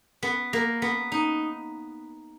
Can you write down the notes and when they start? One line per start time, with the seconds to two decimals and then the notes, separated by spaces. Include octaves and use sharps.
0.23 B3
0.53 A#3
0.82 B3
1.12 D#4